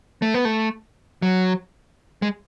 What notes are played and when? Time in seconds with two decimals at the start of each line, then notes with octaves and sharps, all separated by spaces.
0.22 A3
0.34 B3
0.45 A3
1.22 F#3
2.22 G#3